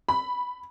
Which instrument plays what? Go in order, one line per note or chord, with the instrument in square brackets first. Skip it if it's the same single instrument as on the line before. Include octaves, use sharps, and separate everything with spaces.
[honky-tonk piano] B5